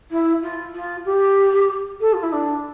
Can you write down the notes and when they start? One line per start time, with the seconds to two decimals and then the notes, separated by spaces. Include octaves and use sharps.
0.11 E4
0.42 F4
0.74 F4
1.05 G4
2.01 A4
2.13 F4
2.23 E4
2.32 D4